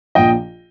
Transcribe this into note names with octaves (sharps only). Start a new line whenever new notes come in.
A#1 A#2 F3 D#5 G5